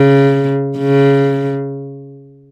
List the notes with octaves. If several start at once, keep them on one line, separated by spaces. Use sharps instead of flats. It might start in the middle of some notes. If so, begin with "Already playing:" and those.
Already playing: C#3
C#3